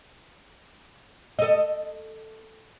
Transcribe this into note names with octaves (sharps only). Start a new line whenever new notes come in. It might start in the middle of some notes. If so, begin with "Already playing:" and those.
A4 D#5